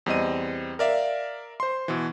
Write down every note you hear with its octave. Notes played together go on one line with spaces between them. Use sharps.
E2 G3 C4 D#5 D#7
A#4 D5 E5 F5
C5 C6
B2 E3